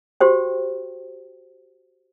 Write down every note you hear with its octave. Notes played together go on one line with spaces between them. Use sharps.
F#4 G4 C5 G5